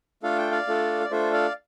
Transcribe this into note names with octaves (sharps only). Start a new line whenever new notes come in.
A3 D4 F4 A4 F5
G5
D5 F5
A3 D4 F4 A4
D5
A3 D4 F4 A4 C5 E5
D5 F5